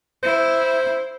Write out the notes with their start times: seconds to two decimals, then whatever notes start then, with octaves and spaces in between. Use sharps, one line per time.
0.23 E4 C5